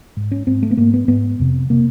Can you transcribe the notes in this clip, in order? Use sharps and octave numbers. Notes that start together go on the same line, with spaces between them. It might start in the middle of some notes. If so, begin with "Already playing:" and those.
G#2
C#4
G#2 C4
A3
B3
G#2 A#3
B3
G#2 B3
F2 C3
C3 A#3